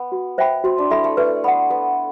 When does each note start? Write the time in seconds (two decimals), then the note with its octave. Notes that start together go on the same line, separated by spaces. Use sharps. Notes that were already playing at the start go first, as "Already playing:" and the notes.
Already playing: B3
0.12 F#4
0.38 C5 E5 G5 B5
0.64 C4 F#4
0.78 D4
0.90 E4 A4 E5 B5
1.04 A3
1.17 A3 B4
1.44 B3 F#5 B5
1.70 B3 A4